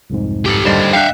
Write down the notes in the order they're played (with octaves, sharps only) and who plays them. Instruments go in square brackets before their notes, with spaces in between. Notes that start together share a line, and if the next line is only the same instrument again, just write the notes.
[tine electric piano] C2 F2 G#2
[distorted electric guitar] G4 A4
[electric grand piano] D#2 D3 G3 [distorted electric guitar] C5 D#5
[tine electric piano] D4 C#7 [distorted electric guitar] E5 F5 [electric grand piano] G5 F#6